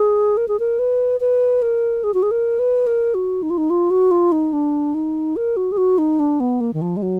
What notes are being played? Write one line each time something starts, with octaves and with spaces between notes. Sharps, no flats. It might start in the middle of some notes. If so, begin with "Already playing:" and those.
Already playing: G#4
A#4
G#4
A#4
B4
B4
A#4
G#4
F#4
G#4
A#4
B4
A#4
F#4
D#4
F4
D#4
F4
F#4
F4
D#4
D4
D#4
A#4
F#4
G#4
F#4
D#4
D4
B3
A#3
D#3
F3
G#3
F#3